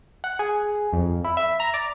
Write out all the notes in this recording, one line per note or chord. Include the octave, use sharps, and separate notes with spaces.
F#5
G#4
F2
E4
E5
A#5
D5